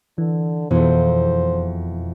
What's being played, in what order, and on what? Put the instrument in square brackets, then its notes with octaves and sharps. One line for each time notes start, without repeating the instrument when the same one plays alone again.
[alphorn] D3 [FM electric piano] E3
[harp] E1 F2 [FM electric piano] B2 E3 [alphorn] C5